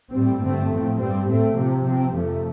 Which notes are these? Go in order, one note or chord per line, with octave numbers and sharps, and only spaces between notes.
A2 G3 C4
G2 D3 A3 C4
A2 F3 C4
G2 G3 C4
A2 A3 C4
C3 F3 C4
C3 F3 C4
F2 C3 F3 A3